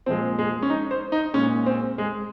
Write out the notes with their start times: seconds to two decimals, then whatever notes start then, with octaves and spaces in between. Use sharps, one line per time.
0.06 A#2 F3 G#3 C4
0.39 G#3
0.63 C#4
0.70 D#4
0.91 C5
1.12 D#4
1.34 A#2 G#3 C#4
1.66 C4
1.98 G#3